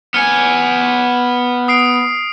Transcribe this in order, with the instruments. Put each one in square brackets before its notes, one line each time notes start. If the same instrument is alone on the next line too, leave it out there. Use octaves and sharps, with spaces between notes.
[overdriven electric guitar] B3 G#5 [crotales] F6 C#7
[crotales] D#6 C7 D7